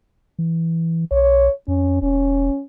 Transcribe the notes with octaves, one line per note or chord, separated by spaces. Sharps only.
E3
B1 C#5
F2 C#4
E1 C#4